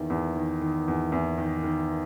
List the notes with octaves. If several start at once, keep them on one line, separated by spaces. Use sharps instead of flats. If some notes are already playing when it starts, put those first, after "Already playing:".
Already playing: E2 D#3
E2
D#3
D#3
E2
E2
D#3
D#3